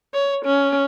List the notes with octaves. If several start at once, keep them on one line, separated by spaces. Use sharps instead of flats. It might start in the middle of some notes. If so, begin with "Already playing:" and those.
C#5
C#4